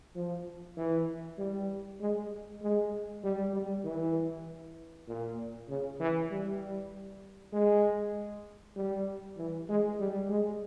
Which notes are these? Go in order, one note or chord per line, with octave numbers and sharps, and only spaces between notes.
F3
E3
G3
G#3
G#3
G3
G3
E3
A#2
C#3
E3
G3
G#3
G3
E3
G#3
G3
G#3